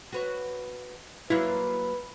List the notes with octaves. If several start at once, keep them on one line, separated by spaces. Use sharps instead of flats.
F#4 B4 C#5
F#3 A#3 E4 F4 B4